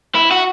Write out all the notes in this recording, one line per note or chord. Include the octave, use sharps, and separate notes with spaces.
E4
F#4